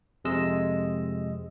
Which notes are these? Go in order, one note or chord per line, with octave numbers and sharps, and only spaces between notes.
F2 C3 G#3 D#5 E6